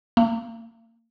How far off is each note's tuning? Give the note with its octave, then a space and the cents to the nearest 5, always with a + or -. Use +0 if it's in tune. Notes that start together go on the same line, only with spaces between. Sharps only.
A#3 -35